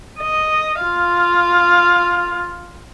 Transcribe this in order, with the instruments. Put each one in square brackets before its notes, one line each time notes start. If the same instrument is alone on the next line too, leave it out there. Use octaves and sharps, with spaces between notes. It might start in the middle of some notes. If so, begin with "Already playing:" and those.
[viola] D#5
F4 F5